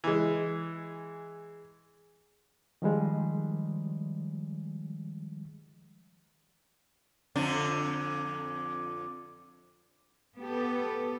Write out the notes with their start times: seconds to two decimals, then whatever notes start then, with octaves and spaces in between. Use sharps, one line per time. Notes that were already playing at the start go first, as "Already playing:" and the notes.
0.04 E3 G#3
2.82 D#3 F3 G3 G#3
7.36 F2 D3 D4
10.40 B3 G4 A4